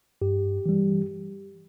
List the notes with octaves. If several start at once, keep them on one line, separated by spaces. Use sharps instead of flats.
G2 G4
E3 G3